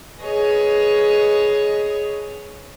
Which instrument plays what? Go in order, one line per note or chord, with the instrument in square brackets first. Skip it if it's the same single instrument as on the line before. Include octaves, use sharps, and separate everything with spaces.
[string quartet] G#4 B4 C#5 D#5